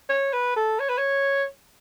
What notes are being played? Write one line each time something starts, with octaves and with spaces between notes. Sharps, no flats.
C#5
B4
A4
C#5
B4
C#5